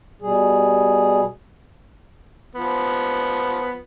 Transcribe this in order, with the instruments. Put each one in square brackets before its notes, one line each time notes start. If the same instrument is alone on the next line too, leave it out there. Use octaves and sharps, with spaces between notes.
[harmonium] B2 G3 G#4
[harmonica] F3 B3